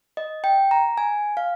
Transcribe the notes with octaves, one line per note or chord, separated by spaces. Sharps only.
D#5
G5
A#5
G#5
F5